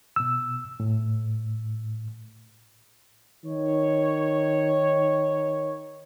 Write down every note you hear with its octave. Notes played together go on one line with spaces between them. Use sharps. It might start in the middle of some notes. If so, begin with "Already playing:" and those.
B2 E6
A2
D#3 C#5